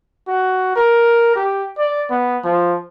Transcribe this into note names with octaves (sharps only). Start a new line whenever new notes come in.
F#4
A#4
G4
D5
B3
F3